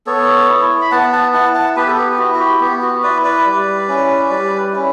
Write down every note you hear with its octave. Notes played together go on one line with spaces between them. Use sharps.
B3 A4 C#5
E4
B5
B3 F#5 A5
F#5 A5
E4 F#5 A5
F#5 A5
B3 G4 B4
A4
G4
G4
E4 F#4
F#4
G4
B3 G4
F#4
E4 B4 D5
B4 D5
G3
C#4 E4
G3
C#4 E4